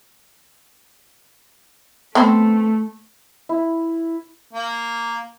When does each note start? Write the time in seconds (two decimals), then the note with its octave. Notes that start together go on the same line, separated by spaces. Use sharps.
2.15 A3 B3 C4 C5
3.49 E4
4.53 A#3